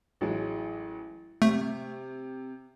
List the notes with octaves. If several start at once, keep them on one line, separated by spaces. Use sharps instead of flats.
A1 F#3 G#3
C3 A3